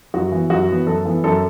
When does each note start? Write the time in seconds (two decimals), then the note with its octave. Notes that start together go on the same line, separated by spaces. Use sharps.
0.14 F#2 F#4
0.32 E3 B3
0.50 F#2 F#4
0.69 E3 B3
0.87 F#2 A4
1.05 E3 B3
1.24 F#2 A4